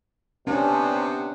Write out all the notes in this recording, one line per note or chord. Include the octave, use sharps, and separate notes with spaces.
C3 B3 C#4 D4